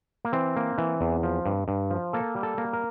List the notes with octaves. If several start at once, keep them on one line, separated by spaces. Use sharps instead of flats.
A#3
E3 C4
A#3
E3
E2
F3
G2
G2
F3
A#3 A4
G3
A4
A#3
A#4